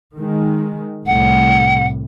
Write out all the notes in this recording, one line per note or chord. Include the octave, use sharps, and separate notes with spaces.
D#3 G#3
C2 A2 C3 F#5